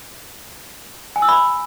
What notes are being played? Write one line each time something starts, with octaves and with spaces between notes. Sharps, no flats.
G#5
E6
B5